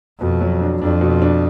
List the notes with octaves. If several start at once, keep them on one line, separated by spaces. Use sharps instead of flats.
F2 B2
F#3
D4
F2 D4
B2
D4